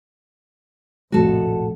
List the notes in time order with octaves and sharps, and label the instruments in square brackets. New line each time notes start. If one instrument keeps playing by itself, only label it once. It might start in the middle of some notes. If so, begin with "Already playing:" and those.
[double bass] F1 A#1 [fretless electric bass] A2 F3 A3 [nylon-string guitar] F#4 A4